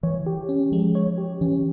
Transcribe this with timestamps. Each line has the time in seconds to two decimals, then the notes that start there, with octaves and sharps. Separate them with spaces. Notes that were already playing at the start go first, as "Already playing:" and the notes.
0.03 E3 C#5
0.26 G4
0.49 C#4
0.72 F3 G#3
0.95 C#5
1.18 G4
1.41 E3 C#4